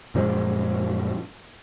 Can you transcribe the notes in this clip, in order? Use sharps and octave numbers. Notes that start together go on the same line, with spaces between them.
F#2 A#2 F3 G#3